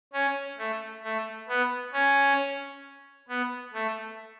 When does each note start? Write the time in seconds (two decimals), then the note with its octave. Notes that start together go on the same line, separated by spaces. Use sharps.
0.13 C#4
0.58 A3
1.04 A3
1.48 B3
1.93 C#4
3.28 B3
3.74 A3